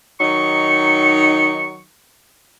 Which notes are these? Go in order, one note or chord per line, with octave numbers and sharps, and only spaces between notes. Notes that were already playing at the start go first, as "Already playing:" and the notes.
D#3 F#3 D#4 C#6